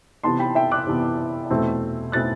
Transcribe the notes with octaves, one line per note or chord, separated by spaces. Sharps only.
C3 E3 B3 A5 C6
G5 B5
E5 G5
D6 F#6
C3 E3 B3
E2 B2 A3 C4 E4
B2 A3 C4 E4 F#6 A6